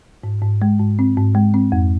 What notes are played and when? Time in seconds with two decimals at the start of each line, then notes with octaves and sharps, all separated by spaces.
0.24 G#2
0.42 G#2
0.62 G#3
0.80 G#2
0.99 C4
1.17 G#2
1.35 G#3
1.54 C4
1.72 F2